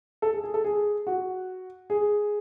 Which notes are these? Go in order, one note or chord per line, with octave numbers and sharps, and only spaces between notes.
A4
G#4
G#4
A4
G#4
F#4
G#4